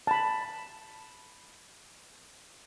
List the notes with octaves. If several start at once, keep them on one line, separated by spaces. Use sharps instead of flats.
A5 B5